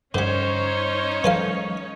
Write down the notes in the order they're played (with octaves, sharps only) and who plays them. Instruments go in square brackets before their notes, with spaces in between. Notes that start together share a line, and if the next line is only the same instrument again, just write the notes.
[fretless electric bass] G2 [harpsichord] D3 G3 [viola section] C#4 D#4 C#5 [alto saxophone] C5
[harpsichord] E3 A4 F5 [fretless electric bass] F#3 G#3